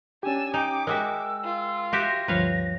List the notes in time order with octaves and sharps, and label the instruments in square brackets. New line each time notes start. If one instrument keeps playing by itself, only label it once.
[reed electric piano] C#4 G4 [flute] D4 [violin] G#5 E6
[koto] D#4 [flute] G5 [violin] D6
[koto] G#3 F#4 E5 [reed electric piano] A#4 G5 [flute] E6
[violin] F4
[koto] F#4 G4 E5 [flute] A#6
[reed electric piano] D2 G2 F3 [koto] B4 C#5 F5